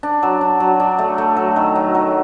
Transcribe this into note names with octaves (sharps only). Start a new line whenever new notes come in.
D4
F#3
D4
F#3
D4
A3
A3
F#3
D#3
F#3
F#3